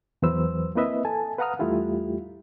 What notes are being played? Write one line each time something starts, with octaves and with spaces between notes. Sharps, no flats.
E2 E3 F#3 B4 C5 E6
A#3 C4 E4 B4 D#5 E5
A4 G#5 A5
B4 F5 F#5 A#5 D#6 F6
E2 G3 A3 E4 F4 G4